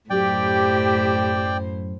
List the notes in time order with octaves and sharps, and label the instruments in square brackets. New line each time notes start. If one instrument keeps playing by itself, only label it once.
[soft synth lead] F#2 [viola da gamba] A2 C5 [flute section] G4 [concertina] D5 G5